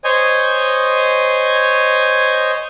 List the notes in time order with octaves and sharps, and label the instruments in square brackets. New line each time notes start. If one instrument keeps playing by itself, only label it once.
[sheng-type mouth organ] C5 C#5 D#5 G#5